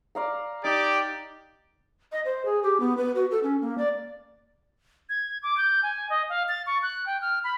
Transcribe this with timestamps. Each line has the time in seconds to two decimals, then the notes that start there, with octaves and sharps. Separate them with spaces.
0.15 D5 F5 A#5
0.64 D#4 G4 D5
2.12 D#5
2.25 C5
2.45 G#4
2.63 G4
2.80 B3
2.97 B4
3.15 F#4
3.31 A4
3.43 C#4
3.62 A#3
3.78 D5
5.09 G#6
5.43 D6
5.58 G6
5.83 G#5
6.10 D#5
6.29 F5
6.49 A6
6.67 C#6
6.83 F#6
7.06 G5
7.22 F6
7.44 B5